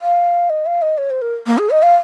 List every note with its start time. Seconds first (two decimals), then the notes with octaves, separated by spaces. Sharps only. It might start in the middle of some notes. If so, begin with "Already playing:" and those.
0.02 F5
0.50 D#5
0.66 F5
0.82 D#5
0.98 C#5
1.10 C5
1.22 A#4
1.47 A#3
1.58 G#4
1.70 D#5
1.82 F5